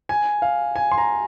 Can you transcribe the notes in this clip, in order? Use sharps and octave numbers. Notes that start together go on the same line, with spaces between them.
G#5
F5
G#5
C6
A#5